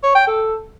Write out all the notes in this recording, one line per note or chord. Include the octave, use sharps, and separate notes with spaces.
C#5
G5
A4